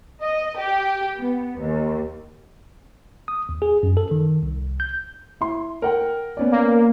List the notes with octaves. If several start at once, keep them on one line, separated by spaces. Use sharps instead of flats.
D#5
G4
B3
D#2
D#6
D#2
G#4
F#2
A4
D#3
C2
G6
E4 C6
A#4 F#5 G5
B3 C#4 D5
A#3